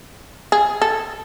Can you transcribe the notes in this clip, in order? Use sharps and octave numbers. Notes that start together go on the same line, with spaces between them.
G#4
A4